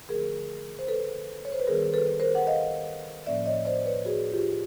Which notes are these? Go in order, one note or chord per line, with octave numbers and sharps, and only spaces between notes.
D3 F3 A3 G#4 A#4
C5
A4 B4
C#5
C5
B4
D#3 G3 B3 G#4 A#4
A4 B4
A#4 C5
F#5
D#5 F5
A2 F3 A#3 C#4 D5 E5
C#5 D#5
C5 D5
B4 C#5
F#4 G#4
F4 G4